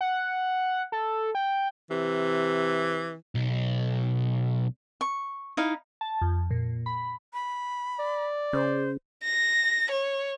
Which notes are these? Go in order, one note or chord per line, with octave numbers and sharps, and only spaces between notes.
F#5
A4
G5
C3 E3
B1
C#6
D#4 E4 F5
A5
F2
A#2
B5
B5
D5
C#3 C5
A#6
C#5